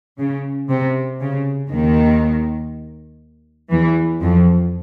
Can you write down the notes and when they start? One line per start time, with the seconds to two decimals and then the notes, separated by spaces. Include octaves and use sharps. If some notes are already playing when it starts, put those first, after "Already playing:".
0.19 C#3
0.69 C3
1.20 C#3
1.70 D#2 D#3
3.71 E2 E3
4.20 F2 F3